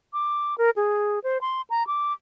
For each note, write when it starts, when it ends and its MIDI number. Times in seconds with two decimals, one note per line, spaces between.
0.13 0.55 86
0.58 0.70 70
0.76 1.19 68
1.24 1.38 72
1.41 1.62 84
1.70 1.86 82
1.87 2.13 86